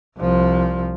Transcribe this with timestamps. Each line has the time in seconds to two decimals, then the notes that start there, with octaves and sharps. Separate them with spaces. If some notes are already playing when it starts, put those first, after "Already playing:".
0.18 C2 F3